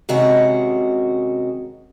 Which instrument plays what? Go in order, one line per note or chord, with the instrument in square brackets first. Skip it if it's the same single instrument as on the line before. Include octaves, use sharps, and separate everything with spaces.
[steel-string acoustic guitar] C3 D#3 G#3 C#4 F#4